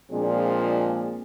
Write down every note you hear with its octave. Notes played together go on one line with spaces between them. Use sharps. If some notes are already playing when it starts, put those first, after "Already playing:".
A#2 F3 G#3 C4 D4 G#4